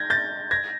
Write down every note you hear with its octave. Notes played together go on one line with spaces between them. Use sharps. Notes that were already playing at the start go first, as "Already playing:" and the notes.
Already playing: G6 G#6 A#6
G6 A6
G#6 A#6